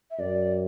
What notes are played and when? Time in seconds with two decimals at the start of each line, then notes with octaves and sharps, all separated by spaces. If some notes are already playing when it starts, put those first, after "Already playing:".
0.11 E5
0.19 F#2 D5